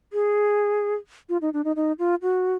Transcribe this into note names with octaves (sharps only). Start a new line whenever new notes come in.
G#4
F4
D#4
D4
D#4
D#4
F4
F#4